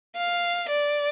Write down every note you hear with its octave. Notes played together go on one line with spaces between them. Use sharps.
F5
D5